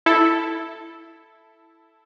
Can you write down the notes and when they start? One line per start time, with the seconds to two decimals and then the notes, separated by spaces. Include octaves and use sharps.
0.06 E4 A4